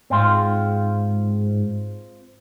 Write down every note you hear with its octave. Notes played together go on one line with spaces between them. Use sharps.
G#2 C4 F4